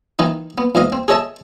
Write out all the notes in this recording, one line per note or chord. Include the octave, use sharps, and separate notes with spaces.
D#3 E3 D#4
B3
E2 G#2 D#5 F5
C4
G#4 A4 C#5 D#5 E5 A5